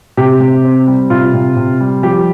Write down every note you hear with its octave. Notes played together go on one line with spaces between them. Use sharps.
C3 G4
C3
C4
G3
C3 F4
C3
C3
G3
F3 G4